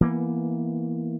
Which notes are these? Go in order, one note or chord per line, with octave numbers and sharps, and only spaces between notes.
E3 A#3 B3